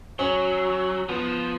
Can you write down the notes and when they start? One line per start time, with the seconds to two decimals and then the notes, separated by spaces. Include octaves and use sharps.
0.19 F#3 C#4
1.09 F3 B3